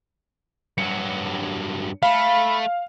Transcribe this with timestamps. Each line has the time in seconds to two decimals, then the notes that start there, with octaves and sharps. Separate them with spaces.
0.78 G2 F#3 C#7
2.03 A3 F5 B5